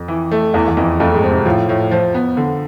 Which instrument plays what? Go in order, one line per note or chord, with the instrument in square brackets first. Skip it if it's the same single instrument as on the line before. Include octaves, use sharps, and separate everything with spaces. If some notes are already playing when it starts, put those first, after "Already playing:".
Already playing: [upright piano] F2
[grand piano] E3
A3
[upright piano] E2 [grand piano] E3
[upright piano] E2
[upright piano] F2 [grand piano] E3
[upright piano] F2 [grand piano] A3
[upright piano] G#2
[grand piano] C4
[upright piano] C3
[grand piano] A2 [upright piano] F3
[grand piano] A2
F3
B3
D3